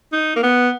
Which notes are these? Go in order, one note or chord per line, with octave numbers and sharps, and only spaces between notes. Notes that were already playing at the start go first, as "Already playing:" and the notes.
D#4
A#3
B3